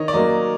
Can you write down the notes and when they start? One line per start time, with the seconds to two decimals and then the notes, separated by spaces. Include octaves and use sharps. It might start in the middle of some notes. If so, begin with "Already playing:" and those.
Already playing: D#3 C#5 D#5
0.08 D5
0.13 F#3 A#3 D#5